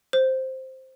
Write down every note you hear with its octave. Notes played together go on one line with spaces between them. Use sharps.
C5